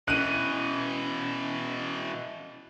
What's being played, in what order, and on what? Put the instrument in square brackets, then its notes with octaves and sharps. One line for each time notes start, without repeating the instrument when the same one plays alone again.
[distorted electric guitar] B2 E3 [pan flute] C#4 [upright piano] F#6 D#7